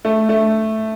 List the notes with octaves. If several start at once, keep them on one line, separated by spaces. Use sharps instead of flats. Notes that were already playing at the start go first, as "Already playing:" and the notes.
A3
A3